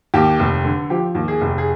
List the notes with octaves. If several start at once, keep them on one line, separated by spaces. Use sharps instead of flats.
D#2 G4
F1
D3
F3 G4
D#2
G#4
F1
G#4